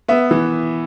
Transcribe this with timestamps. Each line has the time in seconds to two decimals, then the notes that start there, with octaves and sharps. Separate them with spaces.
0.08 B3 E5
0.31 E3